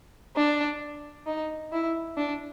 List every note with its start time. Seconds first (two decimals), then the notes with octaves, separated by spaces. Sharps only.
0.36 D4
1.27 D#4
1.72 E4
2.17 D4